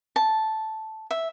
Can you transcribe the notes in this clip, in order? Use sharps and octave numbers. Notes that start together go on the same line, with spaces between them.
A5
E5